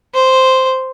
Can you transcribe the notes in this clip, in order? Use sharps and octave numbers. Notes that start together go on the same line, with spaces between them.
C5